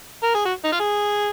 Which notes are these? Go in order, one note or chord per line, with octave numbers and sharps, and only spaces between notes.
A#4
G#4
F#4
D#4
F4
G#4